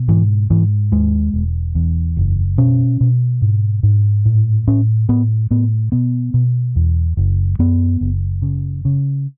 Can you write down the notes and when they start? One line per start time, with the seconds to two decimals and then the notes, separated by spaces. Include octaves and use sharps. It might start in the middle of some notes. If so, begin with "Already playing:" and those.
Already playing: B2
0.08 G#2 E3
0.50 G#2 E3
0.92 D#2 G#3
1.34 E1
1.75 E2
2.17 F#1
2.58 B2 C#4
3.01 B2
3.42 G#2
3.83 G#2
4.25 A2
4.67 A2 C#4
5.09 A2 B3
5.51 A2 B3
5.92 B2 B3
6.34 B2
6.76 E2
7.17 F#1
7.59 F#2 B3
8.01 F#1
8.42 C#3
8.85 C#3